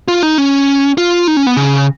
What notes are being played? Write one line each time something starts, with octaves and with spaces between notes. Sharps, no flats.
F4
D#4
C#4
F4
D#4
C#4
B3
C#3